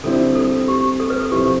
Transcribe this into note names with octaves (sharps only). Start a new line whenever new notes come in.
D3 G3 C4 E4 A4
A4
G4
A4
B4
A4
C3 F3 C4 E4 G4